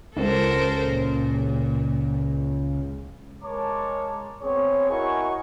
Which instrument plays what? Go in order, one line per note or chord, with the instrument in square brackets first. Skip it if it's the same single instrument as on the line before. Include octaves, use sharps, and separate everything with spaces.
[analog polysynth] C#2 [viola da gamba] A4 A#4 C5
[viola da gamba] A#2
[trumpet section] G#3 A#4 C#5 A5 D6
B3 C4 G#4 C#5
E4 F#4 A#4 D#5 G#5 C#6